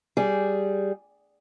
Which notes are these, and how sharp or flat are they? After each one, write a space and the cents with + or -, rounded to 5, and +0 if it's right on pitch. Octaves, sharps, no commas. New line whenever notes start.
G3 -5 G#4 +0